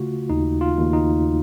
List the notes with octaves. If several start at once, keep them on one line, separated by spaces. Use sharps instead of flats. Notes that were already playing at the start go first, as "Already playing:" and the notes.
Already playing: C#3 A3 F4 F#4
D#2 D#4
F4
D#2
D#4